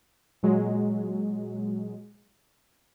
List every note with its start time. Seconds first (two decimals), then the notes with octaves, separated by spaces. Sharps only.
0.43 A#2 F#3 G#3